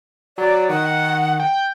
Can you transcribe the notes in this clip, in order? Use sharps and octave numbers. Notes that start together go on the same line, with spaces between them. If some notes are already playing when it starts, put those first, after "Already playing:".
F#3 D5
D#3 F#5
G5